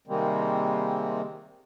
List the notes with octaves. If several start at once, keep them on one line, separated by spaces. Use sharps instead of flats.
C3 D#3 G3 G#3 A#3 C4